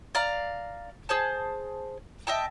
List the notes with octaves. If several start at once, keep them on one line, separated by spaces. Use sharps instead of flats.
D5 F5 A#5
G#4 C5 A5
D#5 E5 G5 A5